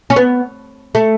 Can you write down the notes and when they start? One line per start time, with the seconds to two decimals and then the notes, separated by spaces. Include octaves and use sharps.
0.10 C#4
0.16 B3
0.95 A3